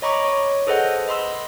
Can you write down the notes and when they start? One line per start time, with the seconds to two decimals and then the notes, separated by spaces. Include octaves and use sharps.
0.02 C#5 D#5 A#5 B5 C#6 D6
0.25 C#5
0.67 G#4 A4 B4 C5 D#5 F#5
1.08 D#5 B5 C6 E6